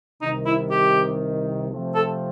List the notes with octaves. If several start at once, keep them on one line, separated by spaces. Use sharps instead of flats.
C2 C3 D#3 D#4
E4
G4
C3 F3 A3 C4 F4
A4